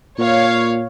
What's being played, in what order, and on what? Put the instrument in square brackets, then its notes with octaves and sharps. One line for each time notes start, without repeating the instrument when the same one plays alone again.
[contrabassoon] A#2 [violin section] C#5 F5